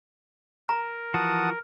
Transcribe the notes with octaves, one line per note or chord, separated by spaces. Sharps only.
A#4 A#5
E3 F3 F#4 F#5 A5 D#6